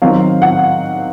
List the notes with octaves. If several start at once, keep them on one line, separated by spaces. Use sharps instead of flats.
D#3 F#3 C4 F5
F#5